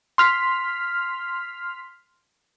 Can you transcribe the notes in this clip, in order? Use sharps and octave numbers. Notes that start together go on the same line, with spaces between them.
C6 F6 B6